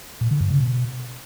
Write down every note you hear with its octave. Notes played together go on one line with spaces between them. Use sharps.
A#2
D3
G2
C#3
B2